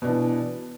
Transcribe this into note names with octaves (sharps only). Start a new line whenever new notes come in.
B2 E3 D4